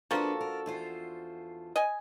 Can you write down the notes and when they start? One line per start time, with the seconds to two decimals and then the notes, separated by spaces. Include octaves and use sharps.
0.11 F3 A#3 B3 D4 F#4 A4 B4 A5
0.41 A#4
0.66 E2 F4 C5
1.76 D#5 G#5